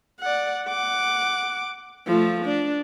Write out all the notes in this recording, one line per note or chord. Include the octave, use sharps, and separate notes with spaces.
D5 F#5
F#5 D6
F3 A3
D4